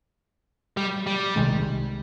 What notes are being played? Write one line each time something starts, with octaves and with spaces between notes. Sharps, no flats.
G3
G3
C2 C3 D#3 G#3